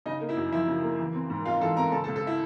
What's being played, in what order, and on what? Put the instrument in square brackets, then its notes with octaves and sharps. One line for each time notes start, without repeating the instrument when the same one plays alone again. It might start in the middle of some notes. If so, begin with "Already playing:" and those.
[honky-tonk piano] C#3 [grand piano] D#4 D#5
[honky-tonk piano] A#3
[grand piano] E4 E5
[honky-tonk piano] F#2
[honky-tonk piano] F3 [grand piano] E4 E5
[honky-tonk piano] C#3
A#3
E3
C4
G#2
[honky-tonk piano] G#3 [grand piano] F4 F5
[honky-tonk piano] E3 [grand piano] A4 A5
[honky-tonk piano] C4 [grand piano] A#4 A#5
[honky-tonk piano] C#3 [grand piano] A4 A5
[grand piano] A4 A5
[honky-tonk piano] C#2
[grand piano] A4 A5
E4 E5